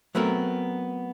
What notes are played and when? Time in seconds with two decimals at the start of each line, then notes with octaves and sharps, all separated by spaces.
0.15 F#3 A3 B3 C4 A#4